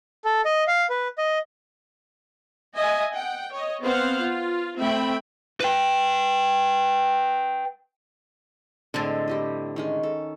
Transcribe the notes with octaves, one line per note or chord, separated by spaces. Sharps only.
A4
D#5
F5
B4
D#5
D#5 E5 G#5
F#5 G5
C#5 D#5
B3 C4 C5 F5 F#5
F4
A3 C4 E5 G5 B5
B4 G5
A2 D3 G#3 C4 C5
G3 G4 D#5
D#3 G#3 C#4
A4